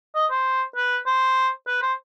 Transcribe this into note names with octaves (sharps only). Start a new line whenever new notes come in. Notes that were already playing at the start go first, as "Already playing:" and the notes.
D#5
C5
B4
C5
B4
C5